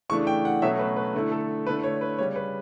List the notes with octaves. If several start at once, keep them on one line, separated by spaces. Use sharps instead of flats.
C#3 E3 A3 D4 C#6
G5
F#5
B2 F#3 A3 C#4 E5
B4
B4
D3 A3 E4
A4
D3 A3 E4 B4
C#5
B4
C#3 G3 C#4 C#5
B4